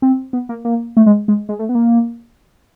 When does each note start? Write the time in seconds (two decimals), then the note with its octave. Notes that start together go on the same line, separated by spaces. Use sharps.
0.02 C4
0.33 B3
0.49 A#3
0.65 A#3
0.97 A3
1.06 G#3
1.28 G#3
1.49 G#3
1.59 A3
1.69 B3
1.75 A#3